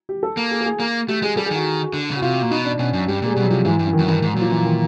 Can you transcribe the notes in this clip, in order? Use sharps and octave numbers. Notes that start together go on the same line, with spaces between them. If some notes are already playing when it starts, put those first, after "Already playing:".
G4
A4
A#3
G#4
A4
G#4
A#3
A3 G4
G#3 G#4
G3 A4
G#4
D#3 F#4
D3
C#3
F#4
C3 F4
A#2
B2 D#4
D4
B2 C#4
F#2
G2 G3
A#2 G#3
B2 G3
F#3
C3 F3
G#2 E3
G2
E3
D#3
F#2 E3
G2 D#3
G#2
A#2 F#3
F3
E3
D#3